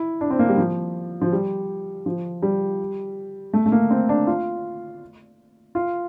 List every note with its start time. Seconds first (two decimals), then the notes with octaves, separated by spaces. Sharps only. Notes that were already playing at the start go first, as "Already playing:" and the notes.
Already playing: E4
0.21 D4
0.30 C4
0.39 A#3
0.49 G3
0.57 F3
1.22 F3
1.32 G3
2.06 F3
2.42 G3
3.53 A3
3.66 A3
3.72 A#3
3.90 C4
4.09 D4
4.27 F4
5.75 F4